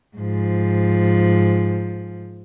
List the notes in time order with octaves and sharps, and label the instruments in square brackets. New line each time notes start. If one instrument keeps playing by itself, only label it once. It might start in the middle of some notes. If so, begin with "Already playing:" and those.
[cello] G#2 F3